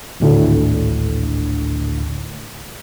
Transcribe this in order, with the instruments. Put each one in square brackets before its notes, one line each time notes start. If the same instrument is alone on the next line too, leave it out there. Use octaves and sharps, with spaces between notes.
[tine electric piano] G#1 D2 A2 D3